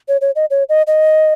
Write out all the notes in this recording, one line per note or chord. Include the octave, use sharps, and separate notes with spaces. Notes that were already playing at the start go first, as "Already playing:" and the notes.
C#5
C#5
D#5
C#5
D#5
D#5